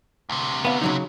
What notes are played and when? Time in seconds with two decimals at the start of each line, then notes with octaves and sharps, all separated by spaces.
0.30 D2 C3
0.65 B3 F5
0.81 C#3 F#3 D#4